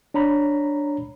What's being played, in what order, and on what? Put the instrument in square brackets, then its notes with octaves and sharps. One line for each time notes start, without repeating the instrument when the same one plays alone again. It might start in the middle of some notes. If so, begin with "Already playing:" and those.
[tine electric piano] D4 C#5 A#5 B5